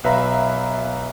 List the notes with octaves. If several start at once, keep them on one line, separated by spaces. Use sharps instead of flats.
B1 B4 E5 F5 A#5 B5